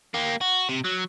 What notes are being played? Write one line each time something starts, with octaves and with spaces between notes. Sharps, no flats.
A#3 G4
F#4
C3
F#3